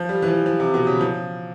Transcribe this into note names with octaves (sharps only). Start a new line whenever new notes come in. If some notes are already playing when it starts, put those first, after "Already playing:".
Already playing: F3
G3
E3
F3
F3
C3
B2
C#3
F3